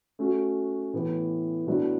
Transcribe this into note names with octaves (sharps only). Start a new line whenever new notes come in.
A3 C#4 F#4
A2 E3 B3
A2 F#3 B3 D4